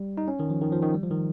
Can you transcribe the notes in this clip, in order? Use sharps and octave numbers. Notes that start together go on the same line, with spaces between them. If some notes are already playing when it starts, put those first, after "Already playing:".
Already playing: G3
D#4
C#4
D#3
F3
D#3
F3
D#3
G3
F3
D#3